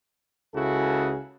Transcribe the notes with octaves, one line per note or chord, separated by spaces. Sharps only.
C#2 C#3 E4 F#4 G#4 A4